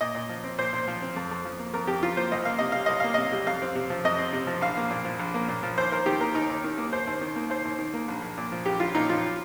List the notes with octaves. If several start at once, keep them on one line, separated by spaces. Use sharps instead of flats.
A#2 D#5
A#2
F3
C4
A#2 C5
A#2
F3
C4
F2
F2
F3
A#3
F2 A#4
F2 G4
F3 F4
A#3 C5
C2 D#5
A#3 F5
C3 D#5
G3 F5
C2 D#5
A#3 F5
C3 D#5
G3
F2 F5
C4
C3
F3
F2 D#5
C4
C3
F3
A#1 F5
A#3
A#2
F3
A#1
A#3
A#2
F3
D#2 C5
D#2 A#4
D#3 G4
A#3 A#4
D#2 D#4
D#2
D#3
A#3
D#2 C5
D#2
D#3
A#3
D#2 C5
D#2
D#3
A#3
A#1
A#1
A#2
F3
A#1 G4
A#1 F4
A#2 D#4
F3 F4